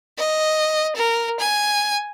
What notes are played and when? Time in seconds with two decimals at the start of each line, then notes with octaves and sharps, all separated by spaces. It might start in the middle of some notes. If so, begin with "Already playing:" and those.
0.18 D#5
0.96 A#4
1.40 G#5